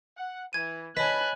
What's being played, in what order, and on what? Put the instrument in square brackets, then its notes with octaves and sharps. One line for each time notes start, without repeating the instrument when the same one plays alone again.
[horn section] F#5
[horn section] E3 [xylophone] G#6 D#7
[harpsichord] B4 [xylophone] C#5 D#5 [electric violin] G#5 F#6 [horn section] A5 B5